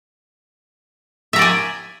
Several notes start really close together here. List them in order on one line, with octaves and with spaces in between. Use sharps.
E5 A#5 D5 G#5